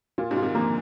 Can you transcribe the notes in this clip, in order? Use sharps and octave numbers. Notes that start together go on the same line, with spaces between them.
A#2 F4
G#2 C3
F4
C3 D#3
D3 F3 A#3